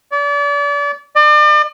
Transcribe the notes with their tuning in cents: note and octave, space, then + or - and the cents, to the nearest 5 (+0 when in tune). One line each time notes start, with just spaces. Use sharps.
D5 -35
D5 +40